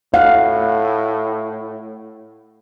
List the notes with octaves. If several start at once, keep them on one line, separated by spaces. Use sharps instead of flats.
A2 F5 F#5